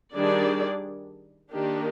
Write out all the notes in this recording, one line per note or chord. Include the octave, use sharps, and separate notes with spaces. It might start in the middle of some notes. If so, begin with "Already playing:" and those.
D#3 G3 D4 G#4 D5
D#3 A#3 D4 G4